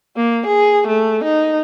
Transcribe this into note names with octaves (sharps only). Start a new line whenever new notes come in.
A#3
G#4
A3
D#4